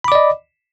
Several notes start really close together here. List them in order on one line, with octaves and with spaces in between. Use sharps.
B5 D6 D5 D#5